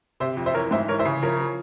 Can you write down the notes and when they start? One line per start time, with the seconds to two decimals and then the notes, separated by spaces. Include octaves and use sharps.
0.20 C3 C5 E5
0.37 F2
0.46 C5 E5
0.54 E3 A#4 C#5
0.71 G#2 C5 E5
0.88 E3 A#4 C#5
0.99 C5 E5
1.05 C#3
1.23 F3 A#4 C#5
1.40 F3